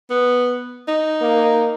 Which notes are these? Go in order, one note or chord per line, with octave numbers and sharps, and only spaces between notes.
B3
D#4
A#3